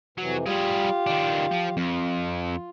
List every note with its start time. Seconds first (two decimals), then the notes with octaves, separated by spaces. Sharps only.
0.18 F2 C3 E3 F#3
0.46 G3 F4 G4 G#4 F5
1.07 D#3 D4
1.51 F3
1.77 F2 F4